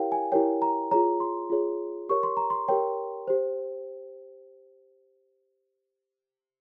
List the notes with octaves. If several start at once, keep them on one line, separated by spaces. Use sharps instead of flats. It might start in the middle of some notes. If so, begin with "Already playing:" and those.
Already playing: E4 G4 A#4 C#5 F5 G5
G#5
E4 G4 A#4 C#5 G5
A#5
F4 G#4 C#5 A#5
C6
F4 G#4 C#5
G4 A#4 C#5 C#6
C6
A#5
C6
G4 A#4 C#5 G5
G4 C5